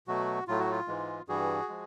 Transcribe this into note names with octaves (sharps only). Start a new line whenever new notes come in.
B2 F#3 A3 F#4
A2 F#3 A3 F4
F#4
F4
G#2 E3 G#3
G2 E3 G3 F#4 G#4
F3 G#3